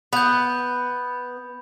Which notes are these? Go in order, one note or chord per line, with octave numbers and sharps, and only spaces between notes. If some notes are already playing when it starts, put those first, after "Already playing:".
B3 B5 G6